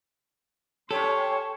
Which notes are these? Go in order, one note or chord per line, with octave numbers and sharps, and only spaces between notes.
C#4 G4 A4 C#5 C6 C#6